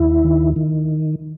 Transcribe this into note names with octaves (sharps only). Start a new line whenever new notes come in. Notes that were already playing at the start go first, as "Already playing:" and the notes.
Already playing: D#2 E4
D#3
D#3